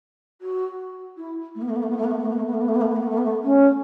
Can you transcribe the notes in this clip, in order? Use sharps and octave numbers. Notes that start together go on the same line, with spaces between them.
F#4
E4
A3
B3
A3
B3
A3
B3
A3
B3
A3
B3
A3
B3
A3
B3
A3
B3
A3
B3
A3
B3
A3
B3
A3
B3
A3
C#4